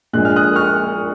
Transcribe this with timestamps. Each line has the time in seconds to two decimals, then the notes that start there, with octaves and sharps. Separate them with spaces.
0.13 A#1 A#2 G#3 F#6
0.25 F6
0.36 D#6 F#6
0.56 C#6 F6